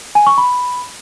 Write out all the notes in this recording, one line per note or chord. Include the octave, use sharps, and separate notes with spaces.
G#5
C#6
B5